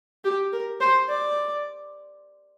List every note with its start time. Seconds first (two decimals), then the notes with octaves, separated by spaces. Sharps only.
0.24 G4
0.53 A#4
0.81 C5
1.09 D5